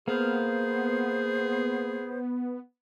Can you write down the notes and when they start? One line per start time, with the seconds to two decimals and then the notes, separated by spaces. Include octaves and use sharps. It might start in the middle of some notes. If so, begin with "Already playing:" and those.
0.08 A#3 B3 G#4 C5 F5